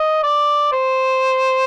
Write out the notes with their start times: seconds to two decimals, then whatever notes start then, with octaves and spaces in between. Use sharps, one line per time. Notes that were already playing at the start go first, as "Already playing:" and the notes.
Already playing: D#5
0.23 D5
0.72 C5